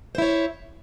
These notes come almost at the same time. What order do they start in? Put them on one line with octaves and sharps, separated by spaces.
C5 E4 C#5